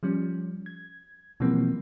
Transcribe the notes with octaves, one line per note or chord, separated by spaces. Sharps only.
F3 G3 C#4
G#6
B2 E3 F3 G3 A#3 C4